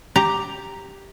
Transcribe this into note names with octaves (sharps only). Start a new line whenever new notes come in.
G4 A#5